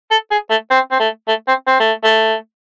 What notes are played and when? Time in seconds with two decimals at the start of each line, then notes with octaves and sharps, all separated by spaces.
0.11 A4
0.31 G#4
0.50 A3
0.70 C4
0.91 C4
0.99 A3
1.27 A3
1.47 C4
1.67 C4
1.79 A3
2.04 A3